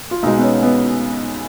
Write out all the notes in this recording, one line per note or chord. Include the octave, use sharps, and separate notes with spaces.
F4
B1 B2 G#3 D#4
B3
C#4
B3